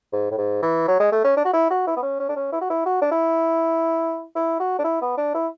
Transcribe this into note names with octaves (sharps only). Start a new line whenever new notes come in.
G#2
A2
G#2
E3
F#3
G#3
A3
C#4
D4
F#4
E4
F#4
E4
B3
C#4
C#4
D4
C#4
E4
F#4
E4
F#4
D4
E4
E4
F#4
D4
E4
B3
D4
E4